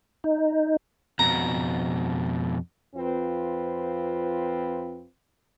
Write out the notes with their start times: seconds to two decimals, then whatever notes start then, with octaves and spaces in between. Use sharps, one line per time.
0.24 D#4
1.19 F2 B2 A#5
2.95 F2 C4 F4 B4